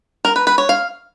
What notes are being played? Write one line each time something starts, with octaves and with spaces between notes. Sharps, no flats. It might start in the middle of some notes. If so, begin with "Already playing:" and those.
A#4
B4
B4
C#5
F5